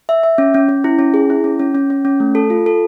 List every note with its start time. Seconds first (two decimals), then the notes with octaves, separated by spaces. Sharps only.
0.09 E5
0.23 E5
0.38 C#4
0.54 C#4
0.69 C#4
0.84 E4
0.99 C#4
1.14 G#4
1.30 E4
1.44 C#4
1.59 C#4
1.75 C#4
1.90 C#4
2.05 C#4
2.20 A3
2.35 A4
2.50 F4
2.66 A4